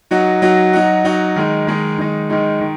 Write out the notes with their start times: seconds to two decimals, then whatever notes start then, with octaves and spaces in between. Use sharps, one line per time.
0.11 F#3 D#4 F#4
0.42 F#3 D#4 F#4
0.73 F#3 D#4 F#4
1.05 F#3 D#4 F#4
1.36 D#3 G#3 D#4
1.67 D#3 G#3 D#4
1.98 D#3 G#3 D#4
2.30 D#3 G#3 D#4
2.61 D#3